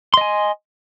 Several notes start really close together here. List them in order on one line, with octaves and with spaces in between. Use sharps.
C6 D#5 G#5